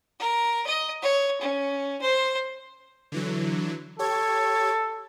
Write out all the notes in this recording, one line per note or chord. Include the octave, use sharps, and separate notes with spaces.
A#4
D#5
C#5
C#4
C5
D3 E3 F#3
G4 A4 C#5 G#6